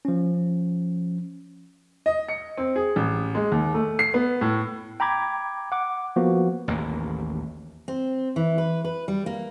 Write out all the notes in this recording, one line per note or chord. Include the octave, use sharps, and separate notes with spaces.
F3 C#4
D#5
C#7
C4
G#4
A1
G#3
D#2
A3
C7
B3
A2
G5 A#5 B5 D6 G#6
F#5 D6
F3 A#3 B3 F#4
A1 D#2 A#3
C4
E3
B4
B4
G3
A#3